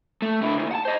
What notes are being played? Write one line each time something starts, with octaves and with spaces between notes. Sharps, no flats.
A3
D3 E4
D2 D#3
F#5 A5
C5 D#5